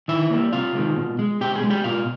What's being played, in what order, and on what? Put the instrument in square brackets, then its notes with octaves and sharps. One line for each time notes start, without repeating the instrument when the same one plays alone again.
[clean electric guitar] D#3 E4 E5
G3 A#3
C3 F4 F5
D#3 G#3
B2
G#3
B2 G4 G5
G#4 G#5
G#3
G4 G5
B2 F4 F5